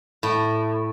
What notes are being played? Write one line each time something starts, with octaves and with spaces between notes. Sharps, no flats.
A2